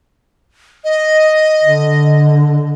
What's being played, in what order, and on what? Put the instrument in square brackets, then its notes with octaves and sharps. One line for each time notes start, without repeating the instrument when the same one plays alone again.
[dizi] D#5
[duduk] D3